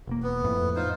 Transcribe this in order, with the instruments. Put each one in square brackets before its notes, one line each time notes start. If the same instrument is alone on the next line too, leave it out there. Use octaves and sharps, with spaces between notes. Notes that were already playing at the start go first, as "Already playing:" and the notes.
[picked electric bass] E1 A#3
[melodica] B3
[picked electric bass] F2 A2
[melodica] D#4 F4 C5